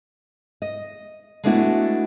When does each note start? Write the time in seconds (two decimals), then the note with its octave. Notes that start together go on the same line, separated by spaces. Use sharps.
0.62 D#5
1.44 G#3 A3 B3 D4 E4 F#4